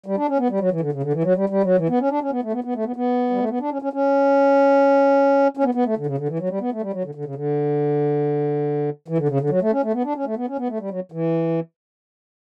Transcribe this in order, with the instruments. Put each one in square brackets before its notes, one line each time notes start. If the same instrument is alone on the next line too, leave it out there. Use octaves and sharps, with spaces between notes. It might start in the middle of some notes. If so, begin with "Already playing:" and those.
[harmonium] G3
D4
C#4
B3
G3
F#3
E3
D3
C#3
D3
E3
F#3
G3
G3
F#3
E3
B3
C#4
D4
C#4
B3
A3
B3
B3
A3
B3
B3
G3
A3
B3
D4
C#4
C#4
C#4
C#4
B3
B3
A3
D3
C#3
D3
E3
F#3
G3
B3
A3
G3
F#3
D3
D3
C#3
D3
E3
D3
C#3
D3
F#3
A3
C#4
A3
B3
D4
C#4
A3
B3
C#4
B3
A3
G3
F#3
E3